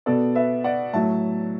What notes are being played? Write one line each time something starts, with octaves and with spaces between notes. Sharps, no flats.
B2 B3 A4 D5
B4 E5
D5 F#5
A2 F#3 A3 E5 A5